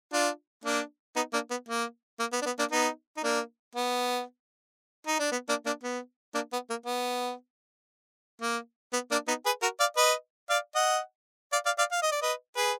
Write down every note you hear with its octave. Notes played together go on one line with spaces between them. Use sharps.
D4 F4
A#3 D4
B3 D#4
A#3 D4
B3
A#3
A#3
B3
D4
B3
A#3 D4
B3 D#4
D#4
A#3 D4
B3
D#4
D4
B3
A#3 D4
A#3 D4
B3
A#3 D4
B3
A#3
B3
A#3
B3
A#3 D4
B3 D#4
G#4 B4
F#4 A#4
D5 F5
B4 D#5
D5 F5
D#5 F#5
D5 F5
D5 F5
D5 F5
F5
D#5
D5
B4 D#5
G#4 B4